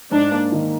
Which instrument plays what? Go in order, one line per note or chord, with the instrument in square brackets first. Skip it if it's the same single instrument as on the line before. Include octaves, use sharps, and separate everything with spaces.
[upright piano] G#2 [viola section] D4
[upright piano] A#3
D#3